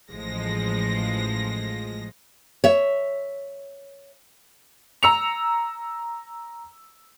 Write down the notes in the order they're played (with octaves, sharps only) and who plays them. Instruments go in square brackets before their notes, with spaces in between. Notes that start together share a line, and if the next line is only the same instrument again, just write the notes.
[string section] A1 F3 G#3 A#6
[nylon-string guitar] C#5 E5
[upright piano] A#5 E6 C#7 F7